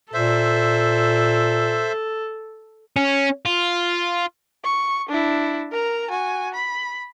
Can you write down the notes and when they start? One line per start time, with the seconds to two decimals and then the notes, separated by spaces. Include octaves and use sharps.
0.14 A#2 A4 C5 E5
2.96 C#4
3.46 F4
4.64 C#6
5.09 D4 E4
5.72 A#4 A#5
6.10 F#4 G#5
6.54 B5